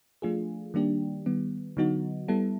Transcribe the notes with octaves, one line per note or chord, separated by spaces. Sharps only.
F3 A3 D4 F4 G#4
D#3 G3 A#3 D4 G4
D#3 G3 B3
D3 F#3 B3 D#4 F#4
G3 B3 E4 A4